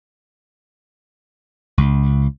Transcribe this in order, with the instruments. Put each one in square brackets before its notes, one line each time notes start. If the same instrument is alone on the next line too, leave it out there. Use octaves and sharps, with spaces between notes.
[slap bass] C#2